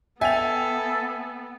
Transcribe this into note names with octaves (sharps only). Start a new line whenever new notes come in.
B3 A4 E5 G5 G#5 F7